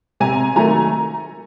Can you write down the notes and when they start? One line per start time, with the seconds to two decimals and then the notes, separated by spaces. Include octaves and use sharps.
0.20 C3 G#5 A#5
0.56 D#3 F#3 A3 G#5 A#5